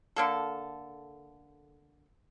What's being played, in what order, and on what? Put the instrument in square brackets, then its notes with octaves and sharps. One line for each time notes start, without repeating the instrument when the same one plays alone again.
[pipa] D3 A#3 A4